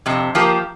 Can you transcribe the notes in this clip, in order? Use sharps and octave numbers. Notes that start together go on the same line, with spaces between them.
F2 C3
F3 A#3 G4 A#4